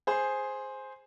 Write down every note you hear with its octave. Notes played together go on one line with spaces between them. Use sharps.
G#4 C5